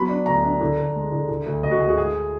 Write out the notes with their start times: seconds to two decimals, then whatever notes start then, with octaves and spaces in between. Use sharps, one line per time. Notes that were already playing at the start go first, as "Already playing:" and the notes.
Already playing: F#3 B3 B5
0.09 D4
0.26 D2 A#5
0.44 D4
0.61 D3
0.78 D3
0.95 G#3
1.12 D3
1.29 D3
1.46 D2
1.63 D2 D#5
1.71 F#4
1.80 D2 G#4
1.88 F#4
1.97 G#3 G#4